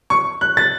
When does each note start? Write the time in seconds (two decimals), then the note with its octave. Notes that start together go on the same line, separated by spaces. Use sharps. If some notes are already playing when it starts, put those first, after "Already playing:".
0.10 C#6
0.41 F#6
0.57 A6